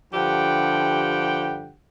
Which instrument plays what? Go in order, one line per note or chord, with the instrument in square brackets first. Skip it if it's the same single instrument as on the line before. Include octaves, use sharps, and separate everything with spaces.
[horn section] G2 D3 F3 G4 F#5 G5